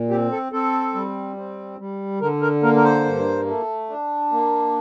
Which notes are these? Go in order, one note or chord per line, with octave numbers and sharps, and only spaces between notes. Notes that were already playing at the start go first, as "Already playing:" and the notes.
Already playing: A#2
C4 G4
A4
C4 A4
G3
C4
G3
D3 A#4
A#4
A#3 A#4
A#4
C5
G2
A3
D4
A#3